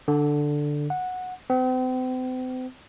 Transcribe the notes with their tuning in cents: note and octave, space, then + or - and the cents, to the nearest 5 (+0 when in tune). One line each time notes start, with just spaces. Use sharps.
D3 +5
F#5 -10
C4 -40